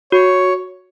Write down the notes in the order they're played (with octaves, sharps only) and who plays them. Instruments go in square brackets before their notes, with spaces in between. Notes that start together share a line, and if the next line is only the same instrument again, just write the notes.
[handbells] F#4 [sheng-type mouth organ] C#5